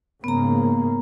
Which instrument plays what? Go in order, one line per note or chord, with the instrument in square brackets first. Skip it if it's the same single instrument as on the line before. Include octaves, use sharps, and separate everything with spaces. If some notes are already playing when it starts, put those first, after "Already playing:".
[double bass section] G#2 C#3 A#3 [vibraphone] B3 A#5